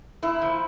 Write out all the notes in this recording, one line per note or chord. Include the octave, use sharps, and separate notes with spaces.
A#2 E4
F3